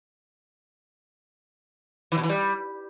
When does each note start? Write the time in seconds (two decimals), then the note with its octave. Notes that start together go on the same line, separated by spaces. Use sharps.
2.12 E3
2.18 B2
2.23 E3
2.29 G3